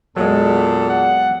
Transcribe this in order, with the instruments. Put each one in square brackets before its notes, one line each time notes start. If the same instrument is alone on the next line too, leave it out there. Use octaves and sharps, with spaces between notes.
[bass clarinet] E2 [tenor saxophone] A#2 [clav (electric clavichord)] F#3 G#3 [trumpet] A4
[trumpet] F#5